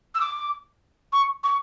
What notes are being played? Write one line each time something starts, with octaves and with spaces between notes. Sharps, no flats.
E6
D6
C#6
C#6